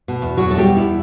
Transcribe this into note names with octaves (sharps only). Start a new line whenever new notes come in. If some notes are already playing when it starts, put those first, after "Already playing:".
B2
E2
E2 F#3 F#4
B2 A4
G3 G4
E2
E4
B2